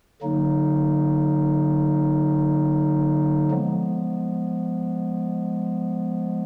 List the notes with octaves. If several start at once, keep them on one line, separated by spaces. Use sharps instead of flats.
D3 F#3 A#3 D#4
F3 G#3 B3